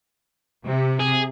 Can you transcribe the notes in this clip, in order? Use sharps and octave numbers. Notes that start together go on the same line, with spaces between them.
C3
G#4